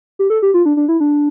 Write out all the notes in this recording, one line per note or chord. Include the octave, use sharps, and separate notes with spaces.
G4
A4
G4
F4
D4
D4
E4
D4